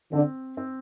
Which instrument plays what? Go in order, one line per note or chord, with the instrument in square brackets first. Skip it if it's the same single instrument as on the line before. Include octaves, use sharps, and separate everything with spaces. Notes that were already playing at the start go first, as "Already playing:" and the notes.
[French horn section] D3 [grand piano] C4
[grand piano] C4